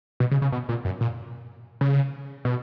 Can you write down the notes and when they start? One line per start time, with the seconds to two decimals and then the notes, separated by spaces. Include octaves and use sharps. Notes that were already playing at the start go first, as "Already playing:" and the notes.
0.20 B2
0.31 C#3
0.42 C#3
0.52 B2
0.69 A#2
0.85 F#2
1.01 A#2
1.81 C#3
2.45 B2